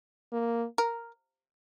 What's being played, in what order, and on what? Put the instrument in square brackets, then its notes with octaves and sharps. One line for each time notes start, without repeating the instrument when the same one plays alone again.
[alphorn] A#3
[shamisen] A#4